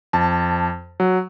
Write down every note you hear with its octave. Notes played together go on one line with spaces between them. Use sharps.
F2 A5
F#3